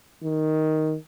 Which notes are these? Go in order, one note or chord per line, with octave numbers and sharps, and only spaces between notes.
D#3